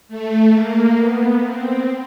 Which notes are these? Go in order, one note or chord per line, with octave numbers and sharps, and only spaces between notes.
A3
A#3
B3
C4